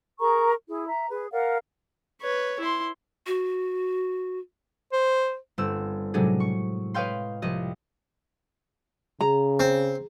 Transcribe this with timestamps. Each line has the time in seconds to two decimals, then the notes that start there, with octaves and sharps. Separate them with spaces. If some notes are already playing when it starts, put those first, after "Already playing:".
0.19 G#4 A#4 A#5 C#6
0.68 E4 G#4
0.88 E5 A#5
1.10 G#4 B4
1.31 A#4 D5 F5 F#5
2.22 B4 C#5
2.59 E4 C6
3.27 F#4
4.93 C5
5.58 G1 C4 E6
6.14 A2 C3 F#3 G#3 D4 G#4
6.40 C#6
6.94 B4 C#5 D#5 F5 G5 C6
7.42 C2 F3 D#5
9.21 C#3 G#4 A#5
9.60 C4